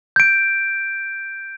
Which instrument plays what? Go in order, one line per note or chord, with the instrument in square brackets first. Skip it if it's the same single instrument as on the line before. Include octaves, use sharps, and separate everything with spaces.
[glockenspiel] G6 D7